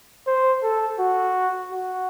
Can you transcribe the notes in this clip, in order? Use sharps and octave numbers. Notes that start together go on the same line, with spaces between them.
C5
A4
F#4
F#4